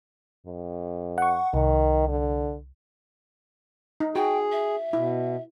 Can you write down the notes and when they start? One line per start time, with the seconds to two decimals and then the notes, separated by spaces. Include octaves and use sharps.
0.46 F2
1.18 F#5 C#6
1.54 C2 D#3
2.08 D3
4.00 D#4
4.16 F#4 G#4 G5
4.52 E5
4.93 B2 E4